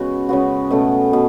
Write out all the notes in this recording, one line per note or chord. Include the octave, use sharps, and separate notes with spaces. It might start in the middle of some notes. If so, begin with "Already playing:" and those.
Already playing: C#3 G#3 B3 F#4
C#3 G#3 B3 F#4
B2 A3 C#4
B2